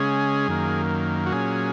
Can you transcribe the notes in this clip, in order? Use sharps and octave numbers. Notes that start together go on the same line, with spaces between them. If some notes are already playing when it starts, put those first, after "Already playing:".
Already playing: C#3 G#3 C#4 G#4
F#2 D#3 A#3
F#4
A#2 F#3 C#4 G#4